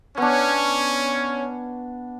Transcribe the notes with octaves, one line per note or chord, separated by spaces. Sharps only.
B3 C#4 D4 C#5